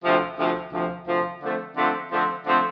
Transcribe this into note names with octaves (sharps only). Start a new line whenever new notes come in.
D2 C3 F3
D2 C3 F3
D2 C3 F3
D2 C3 F3
D3 F3 A3 C4
D3 F3 A3 C4
D3 F3 A3 C4
D3 F3 A3 C4